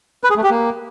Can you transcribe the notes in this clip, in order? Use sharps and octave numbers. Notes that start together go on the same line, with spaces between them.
B4
G#4
A3
G4
A#3